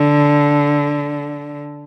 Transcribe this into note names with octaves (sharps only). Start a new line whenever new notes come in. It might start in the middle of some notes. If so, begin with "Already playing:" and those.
Already playing: D3